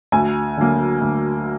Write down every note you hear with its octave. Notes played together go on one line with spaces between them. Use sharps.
D2 G#5
D3 F#3 A#3
D2